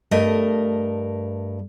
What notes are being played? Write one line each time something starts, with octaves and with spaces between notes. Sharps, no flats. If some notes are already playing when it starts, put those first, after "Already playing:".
G2 A3 A#4 D#5